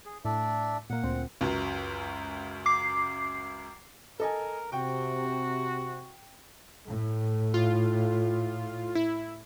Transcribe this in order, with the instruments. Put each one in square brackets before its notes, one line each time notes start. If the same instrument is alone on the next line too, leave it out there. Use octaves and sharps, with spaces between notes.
[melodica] G#4
[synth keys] A2 [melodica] D4 D5 E5
[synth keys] A#2 A#3 [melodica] F#5
[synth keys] D2 A#2 C4
[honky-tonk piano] C#2 F#2
[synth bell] D6 C7
[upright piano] A4 D#5 G#5 [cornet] A#4
[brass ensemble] C3 [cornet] F#4 [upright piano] G5
[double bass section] A2
[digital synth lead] F4
E4